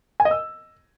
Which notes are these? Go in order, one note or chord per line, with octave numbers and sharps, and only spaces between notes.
G#5
D#5
E6